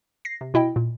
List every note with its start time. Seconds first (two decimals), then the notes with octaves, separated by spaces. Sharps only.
0.25 A#6 C7
0.41 C3
0.54 B2 E4 D#5 G5
0.76 A#2